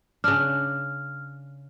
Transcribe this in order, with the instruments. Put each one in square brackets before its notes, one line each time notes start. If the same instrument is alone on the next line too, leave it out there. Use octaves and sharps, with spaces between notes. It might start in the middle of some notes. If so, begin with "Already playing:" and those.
[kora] C#3 D4 [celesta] F6